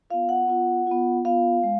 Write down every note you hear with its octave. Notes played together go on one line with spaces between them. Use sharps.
B3 F4 F5
F#5
B3 F4
B3 F4
B3 F4 F5
G#3